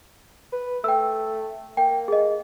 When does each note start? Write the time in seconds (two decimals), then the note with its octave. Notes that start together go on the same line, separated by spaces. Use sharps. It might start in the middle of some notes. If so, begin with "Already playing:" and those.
0.52 B4
0.84 A3 G5 E6
1.77 A#3 G5
2.08 G#4 D#5